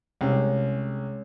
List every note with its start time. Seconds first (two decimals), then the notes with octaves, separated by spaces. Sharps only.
0.21 C2 G#3 C#4